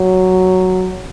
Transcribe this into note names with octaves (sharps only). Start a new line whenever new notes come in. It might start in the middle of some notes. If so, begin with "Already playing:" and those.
Already playing: F#3